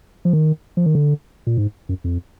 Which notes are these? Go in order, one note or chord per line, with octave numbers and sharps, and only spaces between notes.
F3
D#3
F3
D#3
D3
A#2
G#2
F#2
F2